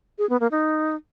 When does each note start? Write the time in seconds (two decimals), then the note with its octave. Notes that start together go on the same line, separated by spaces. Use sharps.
0.18 G#4
0.29 B3
0.40 A#3
0.51 D#4